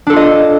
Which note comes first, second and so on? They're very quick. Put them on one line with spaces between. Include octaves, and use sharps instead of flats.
D4 A4 F4 D#5